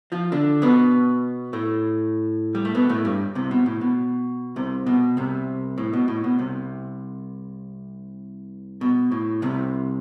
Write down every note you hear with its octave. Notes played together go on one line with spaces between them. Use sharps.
F3 F4
D3 D4
B2 B3
A2 A3
G3
A3
B2 B3
A2 A3
G2 G3
C2 C3
B2
A2
B2
C2 C3
B2
C2 C3
A2
B2
A2
B2
C2 C3
B2
A2
C2 C3